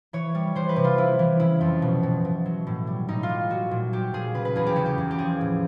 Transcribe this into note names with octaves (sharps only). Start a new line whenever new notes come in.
E3 C#5
G3
E3 C5
B4
C3
F4
E3 E4
E3
C#3 E4
F2
B2
B2
B2
F#3
A2
G3
A2 D#4
F4
G3
F#3 F#4
A#2
F#3 G4
A#2 G#4
C#3 B4
B4
E2 G#4
G4
C#3 F#4
G4
E2
G4
F3 G#4
A2